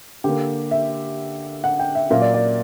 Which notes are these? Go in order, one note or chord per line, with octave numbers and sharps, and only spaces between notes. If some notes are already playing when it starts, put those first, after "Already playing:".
D3 A#3 G4
E5
F#5
G5
E5
A#2 F#3 A#3 E5
D5
D5